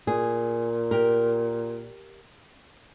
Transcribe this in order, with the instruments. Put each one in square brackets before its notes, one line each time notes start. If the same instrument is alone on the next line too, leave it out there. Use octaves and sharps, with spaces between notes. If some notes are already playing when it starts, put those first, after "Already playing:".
[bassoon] A#2 [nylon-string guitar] G#4
[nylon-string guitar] G4 A#4